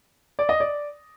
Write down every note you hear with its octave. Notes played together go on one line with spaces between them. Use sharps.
D5
D#5
D5